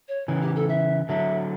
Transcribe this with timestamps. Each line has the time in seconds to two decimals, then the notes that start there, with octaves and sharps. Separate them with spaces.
0.08 C#5
0.28 C#3 E3
0.42 G4
0.55 A4
0.69 E5
1.09 D3 F#3 E5